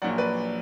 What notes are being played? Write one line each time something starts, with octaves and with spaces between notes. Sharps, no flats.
A#1 A#2 F#3 D5 F#5
B4 D5